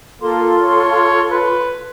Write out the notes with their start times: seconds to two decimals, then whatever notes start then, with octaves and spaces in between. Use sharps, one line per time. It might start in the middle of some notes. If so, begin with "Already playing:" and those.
0.22 A#3 F4 A4 C6
0.61 C#5
1.31 B4